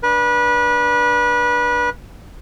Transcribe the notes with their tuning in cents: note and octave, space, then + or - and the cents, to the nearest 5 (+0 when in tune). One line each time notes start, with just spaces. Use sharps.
D4 +0 B4 -25